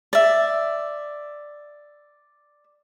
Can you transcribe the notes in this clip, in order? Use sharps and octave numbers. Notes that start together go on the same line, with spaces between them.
D5 E5